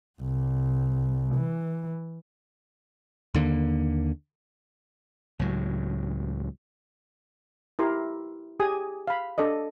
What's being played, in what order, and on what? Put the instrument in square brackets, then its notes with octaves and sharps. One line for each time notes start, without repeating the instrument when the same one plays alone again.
[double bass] C2
E3
[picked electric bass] D#2 D3 A#3
[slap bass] C#2 A2 F#3
[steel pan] E4 G4 A#4 C6
G4 G#4 G#5 D#6
F5 B5
D4 A4 D5 D#5